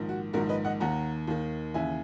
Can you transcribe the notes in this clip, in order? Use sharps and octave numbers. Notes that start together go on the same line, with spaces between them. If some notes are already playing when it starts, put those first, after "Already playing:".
Already playing: A#1 G#2 D#3
F#4
A#1 G#2 D#3 F#4 A#4
B4 D#5
D#5 F#5
D#2 D#3 F#5 A#5
D#2 D#3
D#2 C#3 E3 E5 G#5